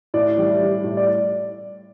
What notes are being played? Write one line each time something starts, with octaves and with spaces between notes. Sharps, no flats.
A2 D5
G3
G3
A2
D5